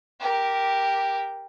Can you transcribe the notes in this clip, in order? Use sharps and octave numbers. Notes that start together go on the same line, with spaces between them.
G4 A#4